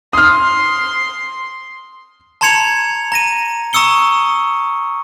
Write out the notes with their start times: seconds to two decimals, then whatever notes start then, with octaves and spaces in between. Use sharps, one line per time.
0.13 C6 D#6 F6
2.41 A5 A#5 C6 G#6 C#7 F7
3.12 A#5 A#6 D#7
3.73 A#5 C#6 D#6 E6 C#7 G7